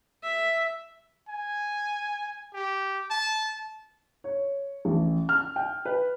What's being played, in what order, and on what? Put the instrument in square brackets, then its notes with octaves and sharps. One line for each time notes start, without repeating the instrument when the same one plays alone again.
[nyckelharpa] E5
[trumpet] G#5
G4
A5
[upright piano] C#5
A1
F6
G5
B4